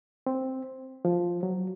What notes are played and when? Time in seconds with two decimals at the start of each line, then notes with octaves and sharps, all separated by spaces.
0.27 C4
1.05 F3
1.43 F#3